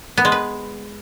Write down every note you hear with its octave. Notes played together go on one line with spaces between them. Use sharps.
B3
G#3
B4